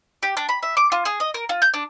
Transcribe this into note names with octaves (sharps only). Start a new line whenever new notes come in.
G4
D4
B5
E5
D6
F4
G#4
D#5
A#4
F4
G6
D4